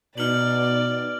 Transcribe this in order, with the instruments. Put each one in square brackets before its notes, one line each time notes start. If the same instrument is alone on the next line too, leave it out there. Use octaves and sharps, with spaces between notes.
[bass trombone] B2 [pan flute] D#4 [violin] D5 [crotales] F6 F#7